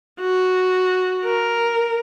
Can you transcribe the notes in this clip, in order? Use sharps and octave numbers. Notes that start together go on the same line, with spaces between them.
F#4
A#4